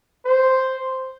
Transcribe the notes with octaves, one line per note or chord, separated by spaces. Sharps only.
C5